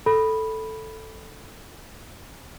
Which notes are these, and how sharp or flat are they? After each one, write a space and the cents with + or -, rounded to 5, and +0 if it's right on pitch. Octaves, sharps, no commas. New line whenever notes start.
A4 +0 B5 -5